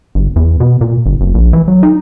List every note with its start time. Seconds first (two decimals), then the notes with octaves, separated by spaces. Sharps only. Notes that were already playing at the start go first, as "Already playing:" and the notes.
0.15 G1
0.36 E2
0.60 B2
0.81 A#2
1.06 G1
1.21 F#1
1.34 A#1
1.53 E3
1.68 F#3
1.83 D#4